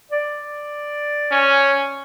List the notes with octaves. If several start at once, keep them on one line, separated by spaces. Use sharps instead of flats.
D5
C#4